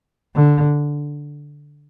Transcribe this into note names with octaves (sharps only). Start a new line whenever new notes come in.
D3